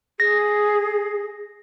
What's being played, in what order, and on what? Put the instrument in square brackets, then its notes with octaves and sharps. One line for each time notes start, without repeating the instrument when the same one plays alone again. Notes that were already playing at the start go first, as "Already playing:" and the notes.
[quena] G#4 [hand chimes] A#6